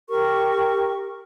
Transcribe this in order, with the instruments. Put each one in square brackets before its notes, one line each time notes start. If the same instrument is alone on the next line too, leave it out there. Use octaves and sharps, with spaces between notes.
[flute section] G4 A#4 C#6